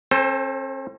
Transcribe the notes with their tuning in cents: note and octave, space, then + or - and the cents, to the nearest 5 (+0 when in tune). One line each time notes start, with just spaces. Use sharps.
C4 +45 A4 +0 C5 +0